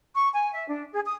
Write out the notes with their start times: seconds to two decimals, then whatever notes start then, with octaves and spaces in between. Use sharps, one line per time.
0.14 C#6
0.34 G#5
0.53 E5
0.67 D4
0.92 G#4
1.05 D#6